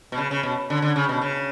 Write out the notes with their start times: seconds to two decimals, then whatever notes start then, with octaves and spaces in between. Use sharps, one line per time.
0.12 B2
0.18 C#3
0.31 C#3
0.43 B2
0.70 D3
0.82 D3
0.96 C#3
1.09 B2
1.22 C#3